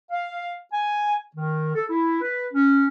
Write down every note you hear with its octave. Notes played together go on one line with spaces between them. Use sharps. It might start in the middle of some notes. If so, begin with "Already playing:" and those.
F5
G#5
D#3
A4
E4
B4
C#4